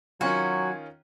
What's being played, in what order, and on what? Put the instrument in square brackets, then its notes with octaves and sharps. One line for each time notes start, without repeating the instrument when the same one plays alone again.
[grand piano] D#3 C#4 F4 [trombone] F#3 [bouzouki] F#4 [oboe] G#5